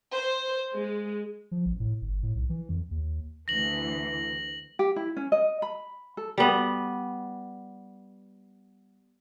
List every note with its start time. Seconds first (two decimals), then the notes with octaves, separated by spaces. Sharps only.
0.12 C5
0.74 G#3
1.51 F3
1.66 A1
1.80 A2
2.01 G1
2.23 A2
2.35 B1
2.49 E3
2.69 F2
2.91 D#2
3.48 D2 E3 A#6 F#7
4.79 G4
4.96 E4
5.17 C#4
5.32 D#5
5.62 B5
6.17 A4
6.38 G3 B3